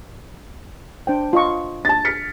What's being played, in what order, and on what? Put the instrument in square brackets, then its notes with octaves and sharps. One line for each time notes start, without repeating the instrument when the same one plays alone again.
[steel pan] D4 C5 G5
F4 D#5 C#6
[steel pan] D4 [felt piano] A5 A6
[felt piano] F6 B6 C#7